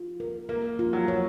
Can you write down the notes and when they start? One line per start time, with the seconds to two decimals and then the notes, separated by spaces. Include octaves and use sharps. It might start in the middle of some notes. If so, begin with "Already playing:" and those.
Already playing: F4
0.20 A#4
0.49 A#3 A#4
0.79 F4
0.93 F#3
1.08 C#5